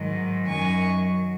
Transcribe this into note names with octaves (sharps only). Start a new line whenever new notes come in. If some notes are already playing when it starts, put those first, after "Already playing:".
Already playing: G#2 D#3 F#3
F#2 D#3 F#3 G#5 C#6
F#3